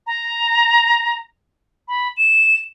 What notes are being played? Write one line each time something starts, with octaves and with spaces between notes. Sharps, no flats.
A#5
B5
E7